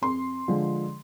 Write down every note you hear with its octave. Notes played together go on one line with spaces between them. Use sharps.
F2 C6
D3 F3 G#3